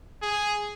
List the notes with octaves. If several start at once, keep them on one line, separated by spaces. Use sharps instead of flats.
G#4